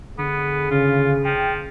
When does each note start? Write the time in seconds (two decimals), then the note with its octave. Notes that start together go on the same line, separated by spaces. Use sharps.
0.18 D3 B3 G#4
0.71 C#3 F4
1.25 F3 G5